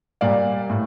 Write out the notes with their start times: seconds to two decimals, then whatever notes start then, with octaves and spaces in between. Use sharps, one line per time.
0.21 A#2 G3 A#3 D5 F5
0.70 A2